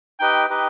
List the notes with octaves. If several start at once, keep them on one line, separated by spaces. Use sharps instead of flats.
D#4 G4 B4 D#5 G5
D#4 G4 B4 D#5